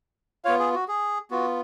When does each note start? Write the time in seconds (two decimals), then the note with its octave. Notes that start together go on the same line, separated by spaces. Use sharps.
0.45 B3 F4 C#5 F5
0.59 G#4
0.74 F#4
0.88 G#4
1.31 B3 F4 F#4